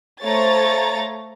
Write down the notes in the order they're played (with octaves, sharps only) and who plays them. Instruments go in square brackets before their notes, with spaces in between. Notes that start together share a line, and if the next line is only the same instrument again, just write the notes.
[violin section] A3 C5 C#5 F5 A#5 A6